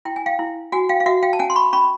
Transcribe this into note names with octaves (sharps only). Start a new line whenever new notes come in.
E4 G5
G#5
F5 G5
E4
F#4 F#5 G#5
F5 G5
F5
F#4 E5 F#5
F5 G5
A5
C#4 F#5 G#5
C6
B5 C#6
C#4 B5 C#6